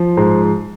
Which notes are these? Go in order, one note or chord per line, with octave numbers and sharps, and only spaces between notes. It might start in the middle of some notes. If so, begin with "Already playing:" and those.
Already playing: F3
G#2 C5